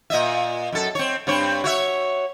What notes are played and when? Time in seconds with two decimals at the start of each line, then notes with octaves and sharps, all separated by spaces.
0.10 A#2 D#5 E5
0.72 F#2 A4
0.95 C4 C#5
1.27 G2 C4 C#5
1.64 F#4 C#5 E5